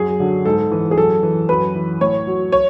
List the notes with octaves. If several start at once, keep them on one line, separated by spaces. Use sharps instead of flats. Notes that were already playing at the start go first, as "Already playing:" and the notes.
Already playing: F#2 G#4
D3 F#3
G#2 A4
E3
G#4
F#2 A4
E3
F#2 B4
E3
A2 C#5
F#3
C#5